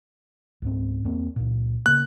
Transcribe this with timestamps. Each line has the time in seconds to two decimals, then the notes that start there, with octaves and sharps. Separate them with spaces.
0.62 C#2 G#2 C4
1.04 E2 A#3 C4
1.36 C#2 A#2
1.86 C#3 A#3 F#6